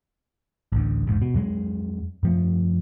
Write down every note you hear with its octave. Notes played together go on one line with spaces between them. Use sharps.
A1 D2
E1 A1 G#2
B2
F2 F#3 G#3
F#2 F3 A3